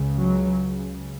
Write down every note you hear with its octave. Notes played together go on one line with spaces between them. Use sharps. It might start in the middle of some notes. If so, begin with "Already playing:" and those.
Already playing: C#2 C#3
F#3